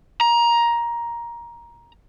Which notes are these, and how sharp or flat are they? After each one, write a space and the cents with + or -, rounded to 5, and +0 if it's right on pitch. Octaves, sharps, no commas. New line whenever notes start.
A#5 +15